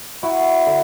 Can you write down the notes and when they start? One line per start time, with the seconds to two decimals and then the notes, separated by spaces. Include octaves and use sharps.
0.23 E4 F#4
0.66 D3